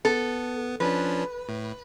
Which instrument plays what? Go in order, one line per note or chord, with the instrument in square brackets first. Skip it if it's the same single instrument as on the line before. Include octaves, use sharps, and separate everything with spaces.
[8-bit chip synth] B3 [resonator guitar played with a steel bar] A4
[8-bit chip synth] F3 C#4 D4 [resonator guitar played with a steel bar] B4
[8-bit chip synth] A2